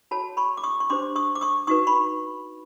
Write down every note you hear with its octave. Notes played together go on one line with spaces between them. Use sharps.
F#4 A4 C#5 A5 B5
B5 C#6
D6
C#6 D#6
C#6
D4 G4 C5 C6 D6
C#6 D#6
D6
C#6 D#6
D#4 F#4 B4 C#6 D#6
B5 C#6